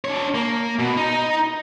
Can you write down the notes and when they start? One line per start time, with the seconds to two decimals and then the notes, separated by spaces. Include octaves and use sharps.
0.05 D4 C#5
0.35 A#3
0.79 B2
0.97 D#4